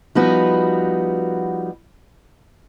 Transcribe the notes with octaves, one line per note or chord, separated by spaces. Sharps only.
F3 G3 B3 D#4 F#4 B4